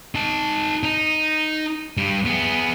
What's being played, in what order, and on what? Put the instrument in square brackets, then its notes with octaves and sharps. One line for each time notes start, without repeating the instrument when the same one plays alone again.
[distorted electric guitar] D#4 A5
D#4
G2 G3
B3 G#4